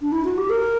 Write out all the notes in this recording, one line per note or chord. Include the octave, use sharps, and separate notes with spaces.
D4
E4
F#4
G4
A#4